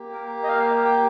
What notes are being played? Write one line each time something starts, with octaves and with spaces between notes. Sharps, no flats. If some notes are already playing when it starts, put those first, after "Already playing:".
Already playing: A#3 G4
A#4
D#5
F5
G5